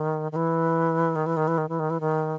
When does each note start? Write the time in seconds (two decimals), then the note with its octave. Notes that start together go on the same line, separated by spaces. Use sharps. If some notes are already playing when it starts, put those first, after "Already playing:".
Already playing: D#3
0.32 D#3
0.36 E3
1.16 D#3
1.26 E3
1.37 D#3
1.48 E3
1.58 D#3
1.69 E3
1.80 D#3
1.90 E3
2.00 D#3